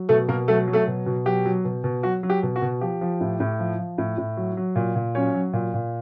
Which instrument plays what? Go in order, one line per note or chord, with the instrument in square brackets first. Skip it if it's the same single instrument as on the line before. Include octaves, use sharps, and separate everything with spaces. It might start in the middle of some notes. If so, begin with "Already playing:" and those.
Already playing: [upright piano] F#3
B2 A3 A4
B2 A#3 A#4
F#3 A3 A4
F#3
A3 A4
B2
B2
F#3 G4
F#3
B2
B2
F#3 F#4
F#3
G4
B2
F#4
B2
F3 G4
F3
A2
A2
F3
F3
A2
A2
F#3
F#3
A#2
A#2
F#3 C#4 C#5
F#3
A#2
A#2